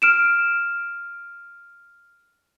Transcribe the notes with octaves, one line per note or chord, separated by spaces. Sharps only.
F6 D7 E7